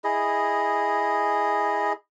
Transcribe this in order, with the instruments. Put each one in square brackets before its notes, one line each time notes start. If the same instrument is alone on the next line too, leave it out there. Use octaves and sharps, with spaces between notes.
[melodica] E4 G#4 D#5